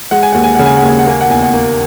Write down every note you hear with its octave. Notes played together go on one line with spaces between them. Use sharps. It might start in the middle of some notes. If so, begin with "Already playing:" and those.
G#3 F#5
G#5
D#2 F#5
G#5
C#3 F#5
G#5
F#5
D#2
G#5
F#5
A#3 G#5
F#5
E2 G#5
F#5
A#3